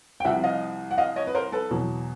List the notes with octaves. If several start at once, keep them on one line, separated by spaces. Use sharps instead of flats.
G5
C2 C3 F3 E5 F#5
D#5 F5
F#5
D#5 F5
C#5 D#5
B4
A#4 C5
A4 B4
E2 B2 F#3